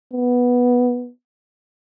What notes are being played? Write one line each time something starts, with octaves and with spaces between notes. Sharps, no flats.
B3